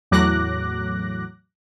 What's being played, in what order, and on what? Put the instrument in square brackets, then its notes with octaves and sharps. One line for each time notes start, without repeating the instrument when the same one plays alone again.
[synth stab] E2 A2 F#3 D6 F#6 A#6